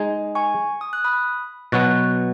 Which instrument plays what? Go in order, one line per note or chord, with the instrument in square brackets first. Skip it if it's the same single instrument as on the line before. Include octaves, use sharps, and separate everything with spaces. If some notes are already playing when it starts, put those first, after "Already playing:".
Already playing: [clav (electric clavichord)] G#3 D#4 G#4
[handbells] G#5 C#6
D#6
F#6
B5 D#6
[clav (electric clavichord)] B2 F#3 B3 [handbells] C#6 F#6